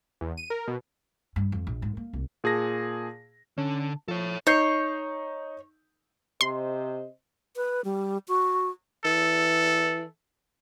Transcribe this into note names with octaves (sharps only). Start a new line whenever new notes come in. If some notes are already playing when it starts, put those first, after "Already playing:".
E2
D#7
A#4
B2
G2
F2
A#1
G#2
A#3
C2
A#2 G#4 A5 A#6
D3 C#4
F3 A4 C#5
D#4 C#5 G6 C7
C3 C5 D#5 C6
B4
G3
F#4
E3 A4